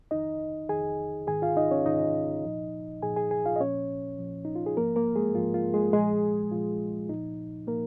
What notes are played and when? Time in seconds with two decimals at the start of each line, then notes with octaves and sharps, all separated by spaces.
0.11 F2 D#3 D#4 D#5
0.69 F2 D#3 G#4 G#5
1.27 G#2 D#3 G#4 G#5
1.42 F4 F5
1.57 D#4 D#5
1.71 C#4 C#5
1.86 G#2 D#3 D#4 D#5
2.44 A#2 F3
3.02 A#2 F3 G#4 G#5
3.16 G#4 G#5
3.31 G#4 G#5
3.46 F4 F5
3.56 D#5
3.60 A#2 F3 C#4 C#5
4.19 A#2 F3
4.45 D#4
4.55 F4
4.66 G#4
4.77 G#2 F3 A#3 A#4
4.96 A#3 A#4
5.16 G#3 G#4
5.35 G#2 F3 F4
5.54 F4
5.74 G#3 G#4
5.93 A#2 F3 G#3 G#4
6.51 A#2 F3 F4
7.09 A#2 F3 D#4
7.67 A#2 F3 A#3 A#4